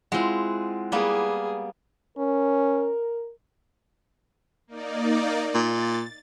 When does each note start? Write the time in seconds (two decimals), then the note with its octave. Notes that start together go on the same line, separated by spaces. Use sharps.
0.12 G#3 C4 E4 F4 F#5
0.92 G3 A#3 B3 G#4
2.18 C#4 A#4
4.67 A#3 D#4 D5
5.55 A#2 A6